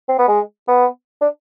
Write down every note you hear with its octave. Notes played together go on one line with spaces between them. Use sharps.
C4
B3
G#3
B3
D4